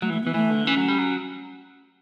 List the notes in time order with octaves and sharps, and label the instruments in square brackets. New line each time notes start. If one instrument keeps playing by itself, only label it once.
[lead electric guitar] F#3 [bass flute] A3
[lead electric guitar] E3
[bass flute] A3
[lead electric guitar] E3 [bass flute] B3
[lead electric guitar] E3 [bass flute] A3
[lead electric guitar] D3
[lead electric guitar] E3 [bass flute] C#4
[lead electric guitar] F#3
G3
F#3